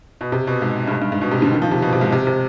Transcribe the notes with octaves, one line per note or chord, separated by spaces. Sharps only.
B2
C3
B2
G#2
G2
G#2
G2
G#2
B2
C3
D3
D#3
F3
C3
B2
C3
G#2
C3
C3